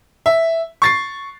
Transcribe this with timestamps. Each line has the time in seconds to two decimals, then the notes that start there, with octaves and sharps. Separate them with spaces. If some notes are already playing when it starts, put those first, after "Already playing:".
0.26 E5
0.82 C#6 A6 C7